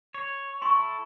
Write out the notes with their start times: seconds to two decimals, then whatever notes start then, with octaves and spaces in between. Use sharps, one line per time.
0.14 C#5
0.62 E4 A4 C6 C#6